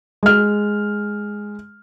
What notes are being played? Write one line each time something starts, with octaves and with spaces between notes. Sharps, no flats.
G#3 F6